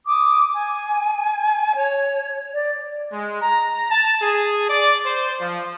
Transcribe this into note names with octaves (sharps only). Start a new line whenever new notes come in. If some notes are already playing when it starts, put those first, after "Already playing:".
D6 D#6
G#5
C#5
D5
G#3
A#5
A5
G#4
D5
C5
F3